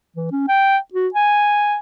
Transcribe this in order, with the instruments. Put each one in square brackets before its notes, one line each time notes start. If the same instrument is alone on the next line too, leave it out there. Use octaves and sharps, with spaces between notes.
[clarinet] E3
C#4
G5
F#4
G#5